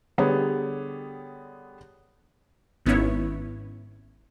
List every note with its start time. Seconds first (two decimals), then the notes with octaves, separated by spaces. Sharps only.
0.18 D3 G3 B3 G4 G#4 C#5
2.86 G#1 B3 C#4 D#4 E4 C#5